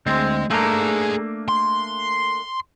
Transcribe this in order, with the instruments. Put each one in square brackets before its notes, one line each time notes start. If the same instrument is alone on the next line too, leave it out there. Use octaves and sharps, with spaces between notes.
[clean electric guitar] D2 C4 [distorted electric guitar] G#3
[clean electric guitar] A3 A#3 D4 [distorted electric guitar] G#4 A#5
[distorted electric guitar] C6